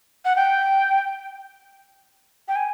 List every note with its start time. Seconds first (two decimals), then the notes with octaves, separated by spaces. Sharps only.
0.25 F#5
0.36 G5
2.48 G5
2.56 G#5